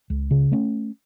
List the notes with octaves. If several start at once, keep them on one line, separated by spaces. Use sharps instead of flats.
C#2
C#3
A3 C#4